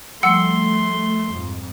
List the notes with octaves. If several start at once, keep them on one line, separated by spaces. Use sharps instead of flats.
F3 G3 A3 F#5 C6 E6 C#7
F2 G#2